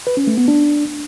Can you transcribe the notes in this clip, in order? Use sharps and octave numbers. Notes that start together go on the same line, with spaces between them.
B4
C#4
A3
B3
D4